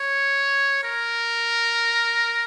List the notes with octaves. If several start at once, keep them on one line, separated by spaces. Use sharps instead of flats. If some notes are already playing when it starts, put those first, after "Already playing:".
Already playing: C#5
A#4